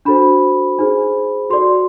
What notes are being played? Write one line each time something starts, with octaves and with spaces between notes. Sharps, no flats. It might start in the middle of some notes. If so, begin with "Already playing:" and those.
D4 F#4 A4 C5 B5
D#4 G#4 C5
F#4 A4 D5 C6